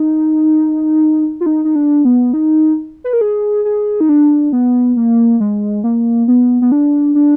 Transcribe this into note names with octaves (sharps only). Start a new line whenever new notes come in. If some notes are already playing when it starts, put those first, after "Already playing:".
Already playing: D#4
F4
D#4
D#4
D4
B3
D#4
B4
A#4
G#4
G#4
D#4
D4
B3
A#3
G#3
A#3
B3
B3
D4
D4